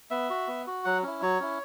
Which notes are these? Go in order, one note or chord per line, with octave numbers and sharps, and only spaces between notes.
B3 E5
F#4
B3
F#4
F#3 F#5
C#4 E4
F#3 C#5
C#4 E4